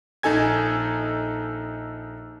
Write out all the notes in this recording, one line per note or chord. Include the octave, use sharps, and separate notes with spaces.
A#1 D#4 A4 G#5 G#6